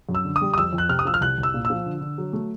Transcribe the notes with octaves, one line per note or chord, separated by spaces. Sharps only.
F#2
E6
D3
D#6
G3
D#6
F2 E6
F2
F#6
C3 F6
D#6
F3 E6
F6
C2 F#6
C2
E6
A#2
E6
F3
D3
D3
F#3
A3